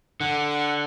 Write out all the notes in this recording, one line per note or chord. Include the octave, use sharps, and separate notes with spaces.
D3 F#5